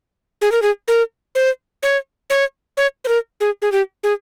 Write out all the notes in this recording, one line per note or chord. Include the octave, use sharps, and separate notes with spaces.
G#4
A#4
G#4
A#4
C5
C#5
C#5
C#5
C5
A#4
G#4
G#4
G4
G#4